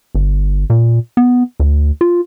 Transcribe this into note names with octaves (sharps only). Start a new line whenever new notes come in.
G1
A#2
B3
D2
F4